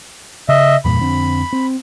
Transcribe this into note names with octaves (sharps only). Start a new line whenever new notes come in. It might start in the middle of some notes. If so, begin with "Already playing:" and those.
C#3 D#5 E5
E2 G2 A#2 B5
F2 D3 C4
C4